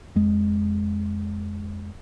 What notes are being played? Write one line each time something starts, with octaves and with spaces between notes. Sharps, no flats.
F2 G#3